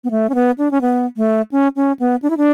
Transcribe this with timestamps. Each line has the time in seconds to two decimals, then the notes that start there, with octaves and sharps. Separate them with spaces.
0.04 B3
0.11 A3
0.29 C#4
0.35 B3
0.58 D4
0.71 C#4
0.81 B3
1.17 A3
1.51 C#4
1.76 C#4
1.99 B3
2.22 D4
2.30 E4
2.37 D4